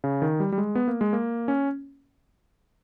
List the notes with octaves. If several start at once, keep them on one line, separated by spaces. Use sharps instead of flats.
C#3
D#3
G3
G3
G#3
B3
A#3
G#3
A#3
C#4